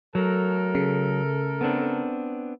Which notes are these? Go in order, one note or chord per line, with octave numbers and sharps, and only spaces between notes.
F#3 A3 A4 A#4
C#3
B3 C4 D4